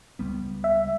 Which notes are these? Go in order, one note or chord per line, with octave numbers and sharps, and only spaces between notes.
C#2 G3 B3
E5